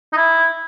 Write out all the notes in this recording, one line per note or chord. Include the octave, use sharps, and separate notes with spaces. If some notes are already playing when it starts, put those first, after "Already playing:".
D#4
E4